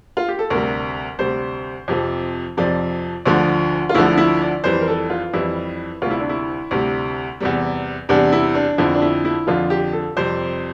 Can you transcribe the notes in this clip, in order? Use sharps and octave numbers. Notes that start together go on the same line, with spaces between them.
F4
G4
A4
D2 C3 G3 A#4
D2 C3 G3 C5
F2 C3 F3
F2 C3 F3 D5
D2 D3 F3
F4
D2 D3 F3 E4
E4
D5
F2 E3 G3 C5
A#4
A4
F4
F2 E3 G3 E4
D2 C3 G3 F4
E4
D4
E4
D2 C3 G3
E2 C3 G3
E2 C3 G3 D4
E4
D4
F2 D3 F3 E4
D4
E4
E4
F2 D3 F3 F4
G4
A4
F2 C3 G3 C5